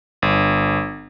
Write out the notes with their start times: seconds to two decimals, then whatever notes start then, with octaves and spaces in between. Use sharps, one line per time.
0.22 G1